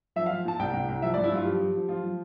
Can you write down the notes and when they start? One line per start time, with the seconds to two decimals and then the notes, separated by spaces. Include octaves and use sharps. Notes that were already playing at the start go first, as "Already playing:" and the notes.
0.16 F3 E5
0.26 F3 F5
0.45 A#2 A5
0.59 C2 G5
0.73 C2
0.88 C2
1.02 F3 E5
1.14 G2 D5
1.24 E4
1.32 G2 F4
1.45 F3 G4
1.60 F3
1.75 F3
1.89 F3 F4
2.04 F3